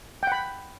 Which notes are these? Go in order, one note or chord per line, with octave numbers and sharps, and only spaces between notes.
F#5 G5 B5